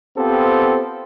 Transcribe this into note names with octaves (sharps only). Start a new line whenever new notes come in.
B3 C4 F4 G4 A4 C5